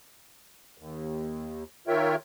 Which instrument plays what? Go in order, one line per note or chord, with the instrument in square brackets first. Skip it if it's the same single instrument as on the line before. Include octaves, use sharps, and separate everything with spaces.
[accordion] D#2
D#3 F4 A#4 C#5 E5 G5